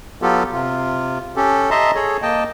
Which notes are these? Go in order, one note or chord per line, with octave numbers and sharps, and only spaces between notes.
F#3 B3 F4 G4 A4
C3 F4
C#4 G4 A4
D#5 E5 A5 A#5 C6
G#4 A4 C#5
A#3 D#5 G5 A5